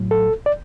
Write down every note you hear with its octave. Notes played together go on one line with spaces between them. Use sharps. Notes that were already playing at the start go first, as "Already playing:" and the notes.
Already playing: A2 F#3
A4
D5